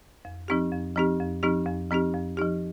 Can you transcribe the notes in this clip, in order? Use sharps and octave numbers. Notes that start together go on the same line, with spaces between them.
F2
F3 C4 D#4 G4
F2
F3 C4 D#4 G4
F2
F3 C4 D#4 G4
F2
F3 C4 D#4 G4
F2
F3 D#4 G4